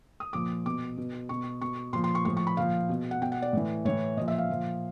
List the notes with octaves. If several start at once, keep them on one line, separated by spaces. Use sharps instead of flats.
D#6
A#2 F3 D6
B2 D6
B2
B2 C#6
B2 C#6
A#2 F3 C6
C6
C#6
A2 F3 C#6
C#6
B5
A#2 F3 F5
B2
F#5
B2 G5
F#5
D5
A2 E3
A2 E3 C#5
A#2 F3 D#5
E5
F5
A#2 F3